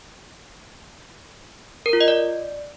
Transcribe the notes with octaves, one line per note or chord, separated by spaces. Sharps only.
A#4
F4
D#5
D5